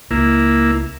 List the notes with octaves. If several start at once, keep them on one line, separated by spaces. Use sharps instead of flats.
C#2 A#3 E4